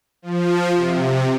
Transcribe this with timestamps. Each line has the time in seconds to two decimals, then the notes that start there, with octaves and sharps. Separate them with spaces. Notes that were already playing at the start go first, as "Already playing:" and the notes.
0.22 F3
0.75 C3